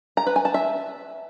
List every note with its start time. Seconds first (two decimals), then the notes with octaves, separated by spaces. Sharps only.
0.17 A#5
0.26 B4
0.36 G#5
0.45 A5
0.54 E5